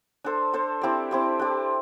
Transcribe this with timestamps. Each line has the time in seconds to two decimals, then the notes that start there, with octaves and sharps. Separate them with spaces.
0.24 D4 A4 C5
0.53 D4 A4 C5
0.82 C4 E4 G4 D5
1.11 C4 E4 G4 D5
1.39 D4 G4 D5